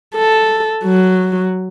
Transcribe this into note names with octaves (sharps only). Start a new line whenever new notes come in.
A4
F#3